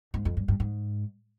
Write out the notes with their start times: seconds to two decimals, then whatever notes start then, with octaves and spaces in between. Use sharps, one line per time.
0.14 G#2
0.25 F2
0.37 G2
0.48 G2
0.60 G#2